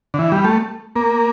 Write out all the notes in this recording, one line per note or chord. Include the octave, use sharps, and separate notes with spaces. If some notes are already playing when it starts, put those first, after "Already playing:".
D3
E3
G3
A3
A#3